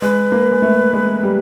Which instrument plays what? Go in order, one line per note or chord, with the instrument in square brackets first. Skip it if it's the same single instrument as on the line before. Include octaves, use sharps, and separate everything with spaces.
[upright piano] G#3 [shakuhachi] B4
[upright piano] A#3
G#3
A3
G#3
G3